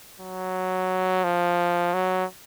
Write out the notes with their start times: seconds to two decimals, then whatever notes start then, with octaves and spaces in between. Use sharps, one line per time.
0.20 F#3
1.24 F3
1.93 F#3